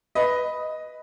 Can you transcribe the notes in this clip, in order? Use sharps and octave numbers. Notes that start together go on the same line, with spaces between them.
B4 D#5